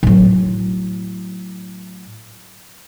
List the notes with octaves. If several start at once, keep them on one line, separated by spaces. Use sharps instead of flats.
A2 F#3